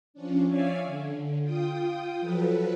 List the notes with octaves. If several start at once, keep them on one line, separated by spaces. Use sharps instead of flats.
F3 C#4 D4
C#5 D5 E5 F5 G#5
D3
F4 G5 D#6
F3 F#3 A4 B4